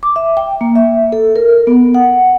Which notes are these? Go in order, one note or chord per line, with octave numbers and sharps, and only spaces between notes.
D6
E5
G5
A#3
E5
A4
A#4
B3
F#5